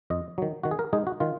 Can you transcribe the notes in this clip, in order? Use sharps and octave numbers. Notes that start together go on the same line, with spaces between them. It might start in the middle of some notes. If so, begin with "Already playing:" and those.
F2 D#5
D#3 F#3
D#3 F#4
G#4
A#4
G#3 D#4 G#4
F#4
D#3 F4